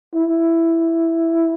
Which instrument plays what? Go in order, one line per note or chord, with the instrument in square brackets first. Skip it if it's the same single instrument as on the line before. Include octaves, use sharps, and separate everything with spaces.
[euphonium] E4